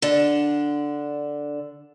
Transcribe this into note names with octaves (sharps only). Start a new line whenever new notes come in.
D3 D4